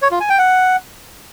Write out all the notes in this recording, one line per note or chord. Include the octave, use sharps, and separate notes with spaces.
C#5
F4
G#5
G5
F#5